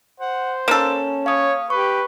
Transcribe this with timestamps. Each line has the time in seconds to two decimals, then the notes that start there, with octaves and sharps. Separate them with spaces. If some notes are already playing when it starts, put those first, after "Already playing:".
0.20 C5 F#5
0.68 A#3 C#4 A4
1.26 C#5 F5 D#6
1.70 G4 B4 C#6